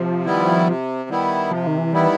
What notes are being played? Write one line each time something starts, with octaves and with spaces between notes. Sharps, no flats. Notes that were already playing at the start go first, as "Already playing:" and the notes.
Already playing: C3 F3
D#3 G3 B3 E4
C3
D#3 G3 B3 E4
C3 F3
D#3
E3
D#3 G3 B3 E4